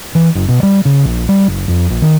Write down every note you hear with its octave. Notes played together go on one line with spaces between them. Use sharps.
E3
F#1
B2
G3
C#3
A#1
G3
F#1
F2
A#1
D#3